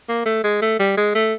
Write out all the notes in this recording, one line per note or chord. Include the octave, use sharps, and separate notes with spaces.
A#3
A3
G#3
A3
G3
G#3
A3